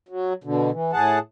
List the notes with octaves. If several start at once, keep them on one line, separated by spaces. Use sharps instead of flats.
F#3
B2 D3
E3
A2 G#4 F#5 A5